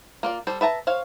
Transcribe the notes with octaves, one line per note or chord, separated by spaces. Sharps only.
A#3 F4 D5
G3 A4 C5
B4 E5 A5 A#5
C5 C#5 F5